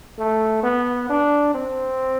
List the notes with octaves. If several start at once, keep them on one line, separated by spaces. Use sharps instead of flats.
A3
B3
D4
C4